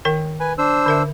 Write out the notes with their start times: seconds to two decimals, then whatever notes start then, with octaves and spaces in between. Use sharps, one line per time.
0.05 D#3 A#4 G5
0.40 B4 G#5
0.58 D4 C5 E6
0.86 D3 A#4 E5